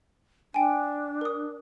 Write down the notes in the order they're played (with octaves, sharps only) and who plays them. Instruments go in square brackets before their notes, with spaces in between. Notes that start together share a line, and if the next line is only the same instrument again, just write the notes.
[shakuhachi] D4 [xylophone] G5 G#5
[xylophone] A#4 D#6